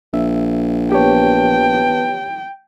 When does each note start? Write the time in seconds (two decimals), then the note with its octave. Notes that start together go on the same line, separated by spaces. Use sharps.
0.14 A#1 E5
0.92 B3 G4 B4 C#5 G5 A5